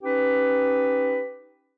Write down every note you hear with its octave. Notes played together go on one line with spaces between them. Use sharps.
C#4 D#4 G4 B4